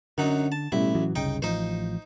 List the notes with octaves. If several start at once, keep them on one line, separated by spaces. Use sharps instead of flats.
F#2 D3 F#3 D#4
A5
A1 B2 G3 E4
A2 E3 F#3
F#1 C2 C#3 D#4 G5
A1 F3 D#4 C5